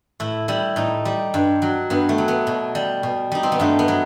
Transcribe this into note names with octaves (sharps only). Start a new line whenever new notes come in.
A2 E4
G3 E4
A2 D#4
G3
G2
F#3
G2 B3
A3
F#3
B3
B2
G3
B2
G3 D#4
C4
B3
G2 A3
B3
F#3